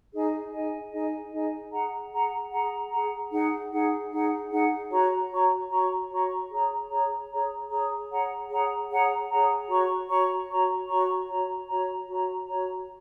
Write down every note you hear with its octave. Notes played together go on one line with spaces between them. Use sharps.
D#4 G#4 D#5 G#5
D#4 G#4 D#5 G#5
D#4 G#4 D#5 G#5
D#4 G#4 D#5 G#5
G#4 F#5 A#5
G#4 F#5 A#5
G#4 F#5 A#5
G#4 F#5 A#5
D#4 G#4 F#5
D#4 G#4 F#5
D#4 G#4 F#5
D#4 G#4 F#5
F#4 C#5 A#5 C#6
F#4 C#5 A#5 C#6
F#4 C#5 A#5 C#6
F#4 C#5 A#5 C#6
G#4 C#5 A#5
G#4 C#5 A#5
G#4 C#5 A#5
G#4 C#5 A#5
G#4 C#5 F#5 A#5
G#4 C#5 F#5 A#5
G#4 C#5 F#5 A#5
G#4 C#5 F#5 A#5
F#4 C#5 A#5 C#6
F#4 C#5 A#5 C#6
F#4 C#5 A#5 C#6
F#4 C#5 A#5 C#6
F#4 C#5 A#5
F#4 C#5 A#5
F#4 C#5 A#5
F#4 C#5 A#5